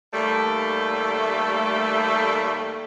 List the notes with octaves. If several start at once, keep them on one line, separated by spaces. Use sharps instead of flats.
D#2 G3 A3